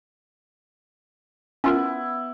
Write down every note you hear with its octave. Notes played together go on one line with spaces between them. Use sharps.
B3 C#4 E4 F4 A#4